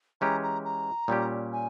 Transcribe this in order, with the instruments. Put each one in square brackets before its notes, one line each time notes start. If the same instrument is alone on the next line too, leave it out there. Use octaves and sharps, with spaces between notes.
[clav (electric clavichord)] E3 G#3 C#4 G4 [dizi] A#5
[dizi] A#5
A#5
[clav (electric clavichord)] A#2 G3 C#4 G4
[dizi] G#5